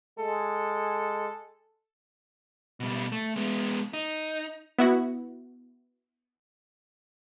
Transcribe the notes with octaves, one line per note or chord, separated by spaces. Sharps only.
G#3 A4
B2 G3
A3
G#3 B3
D#4
B3 E4 F#4